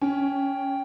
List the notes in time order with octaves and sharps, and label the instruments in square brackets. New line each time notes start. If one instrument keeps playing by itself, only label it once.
[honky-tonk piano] C#4 [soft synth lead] G5